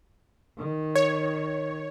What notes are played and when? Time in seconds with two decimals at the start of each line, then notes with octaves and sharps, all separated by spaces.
0.58 D#3
0.95 C#5